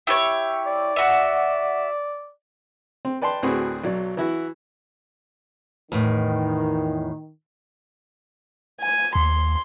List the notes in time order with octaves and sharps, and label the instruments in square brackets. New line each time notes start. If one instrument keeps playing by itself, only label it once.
[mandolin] E4 G4 C#5
[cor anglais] D5
[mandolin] F#4 E5
[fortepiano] C4
B4 D5 G5 A5 C6
D2 A2 C4 F#4 G#4 B4
B1 F#3 D5
E3 E4 F#4
[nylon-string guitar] E2 A2 [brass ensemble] D#3
[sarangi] G#5
[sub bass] D#2 [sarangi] C6